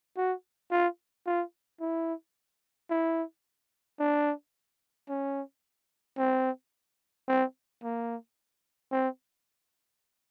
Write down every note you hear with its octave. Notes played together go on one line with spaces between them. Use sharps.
F#4
F4
F4
E4
E4
D4
C#4
C4
C4
A#3
C4